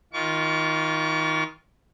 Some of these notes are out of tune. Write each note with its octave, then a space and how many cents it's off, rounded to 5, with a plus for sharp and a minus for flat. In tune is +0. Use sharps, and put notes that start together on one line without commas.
D#3 +25 F4 +0 C#6 +45